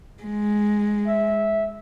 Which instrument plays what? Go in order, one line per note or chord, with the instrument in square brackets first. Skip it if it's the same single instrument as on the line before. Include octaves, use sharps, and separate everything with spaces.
[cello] G#3
[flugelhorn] E5